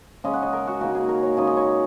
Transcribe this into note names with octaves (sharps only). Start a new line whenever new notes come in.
C#3 G#3 C#4 D#5
F#5
D#5
A#4
F#4
C#3 A#3 D#4 F#4
G#4
A#4
C#5
C#3 G#3 D#4 D#5
D#5
C#5